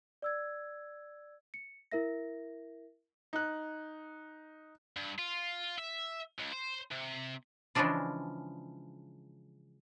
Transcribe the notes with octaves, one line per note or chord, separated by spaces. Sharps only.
D5 E6 G#6
C#7
E4 A#4 E5 A#6
D#4 F#6
G2
F4
E5
C#2
C5
C3
C#3 E3 F3 G#3 D4 F4